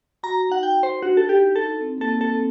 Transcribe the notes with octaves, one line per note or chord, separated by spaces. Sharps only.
F#4 A#5
D#4 F#5
G5
C5
D4 F#4
A4
D#4 G4
D#4 A4
C4
A#3 A4
C4
A4
C4